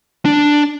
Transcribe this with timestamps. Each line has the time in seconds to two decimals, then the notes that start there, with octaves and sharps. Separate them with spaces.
0.25 D4